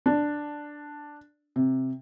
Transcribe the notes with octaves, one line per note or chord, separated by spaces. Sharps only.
D4
C3